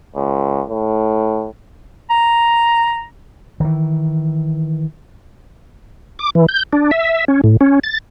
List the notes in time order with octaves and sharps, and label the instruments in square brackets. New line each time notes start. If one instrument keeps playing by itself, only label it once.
[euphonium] C#2
A2
[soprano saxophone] A#5
[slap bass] D#3 E3
[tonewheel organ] D6
E3
G6
D4
E5
C#4
A2
C#4
A6